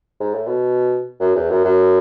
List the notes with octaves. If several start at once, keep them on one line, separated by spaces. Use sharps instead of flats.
G#2
A2
B2
F#2
E2
F#2
F#2